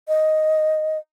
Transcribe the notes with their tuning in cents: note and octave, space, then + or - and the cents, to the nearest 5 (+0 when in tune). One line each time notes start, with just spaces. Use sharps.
D#5 +0